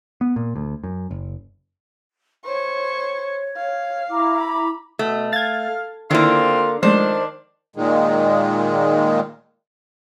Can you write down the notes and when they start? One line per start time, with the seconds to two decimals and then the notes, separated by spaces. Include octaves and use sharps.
0.21 B3
0.36 A#2
0.56 D2
0.84 F#2
1.11 F#1
2.45 C5 C#5 C#6
3.57 F5
4.10 E4 A#5 D6
4.41 B5
4.99 B2 A3
5.33 F5 G#6 A6
6.11 D3 D#3 A#3 C4 E4 F4
6.83 D#3 F3 G#3 A3 D4 C5
7.76 A#2 D#3 G#3